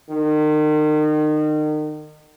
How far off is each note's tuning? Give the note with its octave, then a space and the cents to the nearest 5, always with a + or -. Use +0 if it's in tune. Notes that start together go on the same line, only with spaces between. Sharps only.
D#3 -35